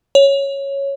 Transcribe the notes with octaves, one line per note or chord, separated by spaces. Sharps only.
C#5